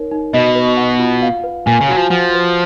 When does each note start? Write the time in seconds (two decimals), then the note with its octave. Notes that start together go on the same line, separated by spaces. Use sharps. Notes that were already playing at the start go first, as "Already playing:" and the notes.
Already playing: D#4 A#4 C#5
0.11 D#4
0.33 B2 D#5
0.55 B4
0.77 F#5
0.99 F4
1.22 F5
1.44 B4
1.66 A#2 G#5
1.81 C#3
1.88 F#3 F#4
1.96 F3
2.10 F3 F#5
2.33 B4